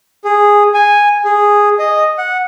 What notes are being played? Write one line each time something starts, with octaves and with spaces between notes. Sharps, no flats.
G#4
G#5
G#4
D#5
F#5